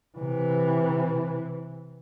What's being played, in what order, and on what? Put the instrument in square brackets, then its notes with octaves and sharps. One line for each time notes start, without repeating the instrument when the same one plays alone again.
[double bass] C3 E3